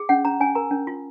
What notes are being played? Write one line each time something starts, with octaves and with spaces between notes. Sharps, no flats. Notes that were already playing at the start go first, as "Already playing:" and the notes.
Already playing: G#4
C#4 F#5
C#4 A#5
C#4 G#5
A#4 A#5
C#4
F4